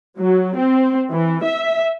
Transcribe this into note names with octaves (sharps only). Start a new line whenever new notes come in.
F#3
C4
E3
E5